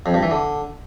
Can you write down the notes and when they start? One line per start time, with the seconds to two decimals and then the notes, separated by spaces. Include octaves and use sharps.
0.06 F2
0.14 G2
0.23 E3
0.31 D3